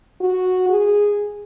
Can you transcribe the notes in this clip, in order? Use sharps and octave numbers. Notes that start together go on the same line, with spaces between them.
F#4
G#4